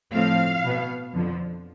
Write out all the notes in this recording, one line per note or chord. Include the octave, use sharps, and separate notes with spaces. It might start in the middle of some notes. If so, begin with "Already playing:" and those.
A2 F3 A3 C4 F5
B2 B3
F2 D3 F3